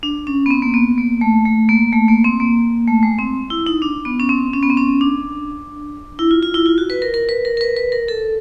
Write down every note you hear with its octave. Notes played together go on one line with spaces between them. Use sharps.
D4
C#4
B3
C4
A#3
B3
A#3
A3
A3
A#3
A3
A#3
C4
A#3
A3
G#3
C4
E4
D#4
D4
B3
C#4
C4
C#4
B3
C4
C#4
D4
E4
F4
F4
E4
F4
F#4
B4
A#4
A#4
B4
A#4
A#4
B4
B4
A#4
A4